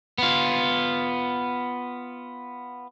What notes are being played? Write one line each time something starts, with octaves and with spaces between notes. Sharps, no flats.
B3 F4